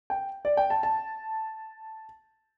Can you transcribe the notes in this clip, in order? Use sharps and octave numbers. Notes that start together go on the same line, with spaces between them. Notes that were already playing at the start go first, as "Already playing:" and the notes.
G5
D5
G5
A5
A5